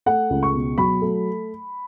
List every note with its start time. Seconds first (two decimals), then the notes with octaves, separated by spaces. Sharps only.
0.06 A3 F#5
0.30 C#2
0.43 C#6
0.54 B2
0.78 F#3 B5
1.02 A3